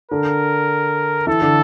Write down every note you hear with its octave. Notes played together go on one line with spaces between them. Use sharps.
D3 A#4
E3 A4
D3